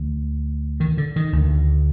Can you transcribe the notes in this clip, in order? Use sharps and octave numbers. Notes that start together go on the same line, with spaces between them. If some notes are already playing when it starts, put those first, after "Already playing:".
Already playing: D2
D#3
D3
D#3
D2 D3